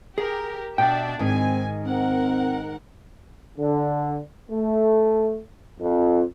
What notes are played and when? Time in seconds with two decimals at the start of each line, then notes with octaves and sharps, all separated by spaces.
0.18 G4 G#4 A#4
0.78 B2 D4 D5 E5 G5
1.19 G#2 D#3 G#3 C4 G#5
1.84 C4 A#4 F#5
3.58 D3
4.51 A3
5.80 F2